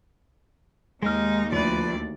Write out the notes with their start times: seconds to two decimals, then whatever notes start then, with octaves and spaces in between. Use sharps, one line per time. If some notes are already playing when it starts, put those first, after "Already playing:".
1.03 D#2 G#3 D#4 F6
1.52 D2 F3 B4 D5